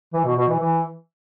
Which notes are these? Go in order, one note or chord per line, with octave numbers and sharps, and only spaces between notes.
E3
B2
B2
E3
E3